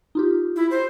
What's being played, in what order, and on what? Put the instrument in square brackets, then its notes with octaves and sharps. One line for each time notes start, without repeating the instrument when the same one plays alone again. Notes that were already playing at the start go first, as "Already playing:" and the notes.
[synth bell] D#4 F4 G4
[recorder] E4
C5